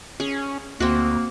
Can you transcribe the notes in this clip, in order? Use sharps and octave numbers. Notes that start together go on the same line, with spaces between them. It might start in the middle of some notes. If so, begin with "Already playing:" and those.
C#4 G#4
D2 A#3 C4 F#4